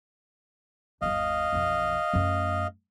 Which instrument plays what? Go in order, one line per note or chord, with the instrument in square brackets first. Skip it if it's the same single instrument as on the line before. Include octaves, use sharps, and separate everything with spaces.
[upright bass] G1 D#2 [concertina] D#5 F5
[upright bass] B1 F2
F#2 A3